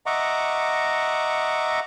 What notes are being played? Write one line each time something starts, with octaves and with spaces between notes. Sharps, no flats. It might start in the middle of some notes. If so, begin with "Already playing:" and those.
D#5 E5 F#5 A#5 C#6 D6